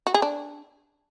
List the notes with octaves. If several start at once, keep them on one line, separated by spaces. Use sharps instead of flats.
F#4
G#4
D4